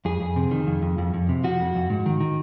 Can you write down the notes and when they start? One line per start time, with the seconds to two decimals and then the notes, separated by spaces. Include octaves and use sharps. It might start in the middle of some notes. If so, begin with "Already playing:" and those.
0.05 F2 G#4
0.20 F2
0.36 C3
0.51 D#3
0.67 F2
0.82 F2
0.98 F2
1.14 F2
1.29 C3
1.44 F3 F#4
1.60 F2
1.75 F2
1.90 G#2
2.06 D#3
2.20 D#3